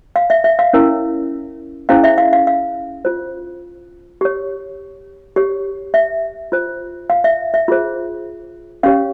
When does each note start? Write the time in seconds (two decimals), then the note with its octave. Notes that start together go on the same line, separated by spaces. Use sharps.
0.16 F5
0.30 E5
0.44 E5
0.59 F5
0.73 C#4 E4 A#4 C#5
1.89 C#4 E4 G#4 C5 F5
2.04 E5
2.18 F5
2.33 F5
2.47 F5
3.05 F4 C5
4.21 G4 C#5
5.36 G4 C#5
5.94 E5
6.52 F4 C5
7.10 F5
7.24 E5
7.54 E5
7.68 F4 G#4 C5
8.83 C#4 G4 C#5 F5